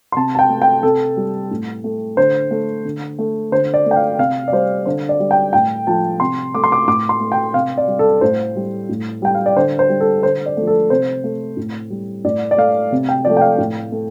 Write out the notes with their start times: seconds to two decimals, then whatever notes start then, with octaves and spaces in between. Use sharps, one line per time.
0.12 C6
0.16 C3 A5
0.35 A5
0.39 G5
0.50 A3
0.62 G5
0.83 C3 A4
1.17 G3
1.51 A2
1.84 A3
2.17 D3 C5
2.51 A3
2.85 D3
3.19 A3
3.52 D3 C5
3.74 D5
3.86 A3
3.91 G5
3.96 F5
4.18 C3 F5
4.48 D5
4.52 G3 C5
4.86 D3 C5
5.09 D5
5.20 G3
5.31 G5
5.53 A2 G5
5.87 F3 A3 A5
6.20 C3 C6
6.55 A3 D6
6.64 C6
6.72 D6
6.87 A2 D6
7.09 C6
7.20 A3
7.32 G5
7.54 C3 F5
7.78 D5
7.88 G3
7.99 A4
8.21 A2 C5
8.56 G3
8.89 A2
9.22 G3 G5
9.35 F5
9.46 D5
9.56 D3 C5
9.79 C5
9.89 G3
10.00 A4
10.23 D3 C5
10.46 D5
10.57 F3 A3
10.67 A4
10.90 C3 C5
11.24 A3
11.57 A2
11.90 G3
12.25 A2 D5
12.51 D5
12.57 A3 F5
12.92 C3
13.09 G5
13.25 F3 A3 D5
13.37 G5
13.41 F5
13.58 A2
13.92 A3